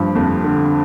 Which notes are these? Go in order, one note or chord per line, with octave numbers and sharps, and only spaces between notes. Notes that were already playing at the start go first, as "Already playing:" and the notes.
Already playing: G2 F3
F2
D3